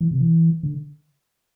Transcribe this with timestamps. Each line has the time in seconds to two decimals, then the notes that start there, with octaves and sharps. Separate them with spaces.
0.01 E3
0.11 C3
0.21 E3
0.63 D3